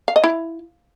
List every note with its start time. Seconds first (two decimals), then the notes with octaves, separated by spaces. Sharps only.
0.08 F5
0.16 D#5
0.24 E4